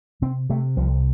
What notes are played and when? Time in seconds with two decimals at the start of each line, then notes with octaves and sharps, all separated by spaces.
0.22 C3 C4
0.50 C3 A3
0.76 C2 F3